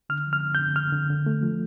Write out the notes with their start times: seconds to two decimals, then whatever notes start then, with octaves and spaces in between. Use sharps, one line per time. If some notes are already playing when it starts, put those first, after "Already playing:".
0.10 D3 F6
0.27 F3
0.33 F6
0.43 D3
0.55 G6
0.59 D3
0.76 D3 F6
0.92 D3
1.10 D3
1.26 A3
1.43 F3